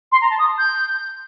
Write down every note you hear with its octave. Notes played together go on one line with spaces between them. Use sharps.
C6
A#5
A5
D#6
G6